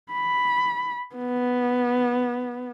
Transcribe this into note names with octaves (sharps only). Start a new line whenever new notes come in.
B5
B3